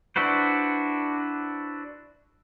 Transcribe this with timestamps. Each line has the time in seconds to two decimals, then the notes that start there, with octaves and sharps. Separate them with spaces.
0.16 D4 E4 F#4 B4 C5